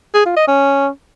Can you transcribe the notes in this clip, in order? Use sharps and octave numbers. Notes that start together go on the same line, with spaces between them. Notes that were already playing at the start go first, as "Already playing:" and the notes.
G#4
F4
D#5
C#4